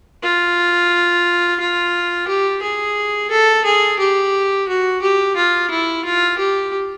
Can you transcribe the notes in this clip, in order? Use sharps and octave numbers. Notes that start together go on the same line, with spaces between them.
F4
F4
G4
G#4
A4
G#4
G4
F#4
G4
F4
E4
F4
G4